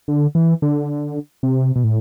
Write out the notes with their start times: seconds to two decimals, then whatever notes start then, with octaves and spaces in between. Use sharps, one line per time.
0.08 D3
0.35 E3
0.62 D3
1.43 C3
1.76 B2
1.84 A2